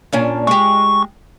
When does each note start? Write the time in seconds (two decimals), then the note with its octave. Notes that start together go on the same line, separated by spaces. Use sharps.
0.13 A#2 C#4 D4
0.47 G#3 G4 C#6